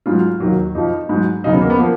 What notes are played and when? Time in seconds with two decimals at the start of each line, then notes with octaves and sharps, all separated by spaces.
0.06 G#2 F#3 F4
0.40 D#2 D#3 F#3
0.75 F2 F3 D#4
1.09 G#2 F#3
1.44 D#2 C#3 F#3 D#4
1.53 B3
1.61 A#3
1.70 B3
1.78 F3 A#3